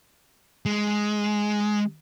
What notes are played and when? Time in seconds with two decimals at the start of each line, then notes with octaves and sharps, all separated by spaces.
0.66 G#3